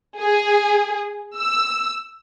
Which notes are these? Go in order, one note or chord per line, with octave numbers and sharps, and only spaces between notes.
G#4
E6